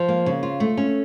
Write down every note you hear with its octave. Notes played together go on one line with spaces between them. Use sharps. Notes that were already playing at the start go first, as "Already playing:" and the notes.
Already playing: F3
A#3
C#3
F4
A3
C#4